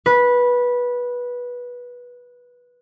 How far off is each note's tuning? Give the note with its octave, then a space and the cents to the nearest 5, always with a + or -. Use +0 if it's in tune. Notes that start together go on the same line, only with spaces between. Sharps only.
B4 -15